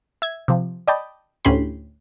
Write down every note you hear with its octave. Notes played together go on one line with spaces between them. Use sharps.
E5 G#6
C3 F3
D5 D#5 G5 A5 B5
D2 A2 C#4 G4 B5 C6